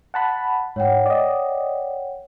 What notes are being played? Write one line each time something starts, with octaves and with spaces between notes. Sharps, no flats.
F#5 A5 B5
G#2 C#5 F#5 G5
D5 D#5